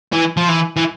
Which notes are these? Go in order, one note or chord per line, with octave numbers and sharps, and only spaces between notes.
E3
F3
E3
E3